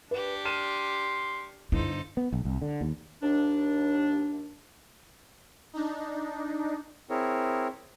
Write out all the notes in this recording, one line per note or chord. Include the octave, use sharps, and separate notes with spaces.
D4 G4 B4 C#6
C6 F6 D#7 E7
G1 D#4 E4 A4 C5
B3
B1
C2
D3
D#2
D#2 D4
D4 D#4
C4 E4 G#4 A#4 C#5